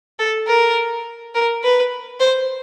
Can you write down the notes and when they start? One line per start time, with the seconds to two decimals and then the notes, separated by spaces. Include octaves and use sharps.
0.19 A4
0.47 A#4
1.35 A#4
1.63 B4
2.20 C5